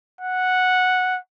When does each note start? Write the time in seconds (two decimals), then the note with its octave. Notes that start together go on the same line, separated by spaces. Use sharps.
0.21 F#5